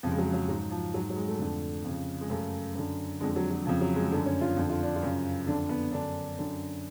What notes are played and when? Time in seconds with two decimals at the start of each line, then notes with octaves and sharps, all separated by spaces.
0.03 F2 C#3 F3
0.12 G#3
0.18 F#3
0.33 F#3
0.48 G#2 F#3
0.71 F3
0.94 G#2 F#3
1.10 F#3
1.16 G#3
1.28 A3
1.39 F2 D3
1.84 F2 C#3
2.21 G#3
2.30 F#2 C#3 A3
2.75 F#2 D3
3.20 D3 G#3
3.23 F2
3.36 F#3
3.51 F#3
3.66 F2 C#3 F3
3.81 F#3
3.96 G#3
4.11 F#2 D3 A3
4.26 C#4
4.41 F4
4.57 F2 D3
4.69 F4
4.82 D4
4.96 F4
5.02 F#2 C#3
5.47 F2 D3 D4
5.69 B3
5.92 F#2 D3 D4
6.38 F#2 D3